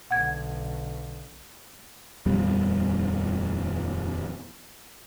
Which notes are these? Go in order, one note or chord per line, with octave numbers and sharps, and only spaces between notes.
B1 D3 F#5 G#6
D#1 F2 G3 B3